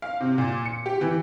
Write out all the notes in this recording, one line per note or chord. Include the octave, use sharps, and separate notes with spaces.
F5
C3
A#2
C#7
G4
E3